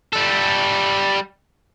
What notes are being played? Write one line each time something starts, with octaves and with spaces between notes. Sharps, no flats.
G3 A4